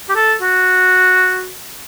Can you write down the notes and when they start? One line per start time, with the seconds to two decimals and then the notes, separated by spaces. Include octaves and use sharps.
0.09 G4
0.15 A4
0.42 F#4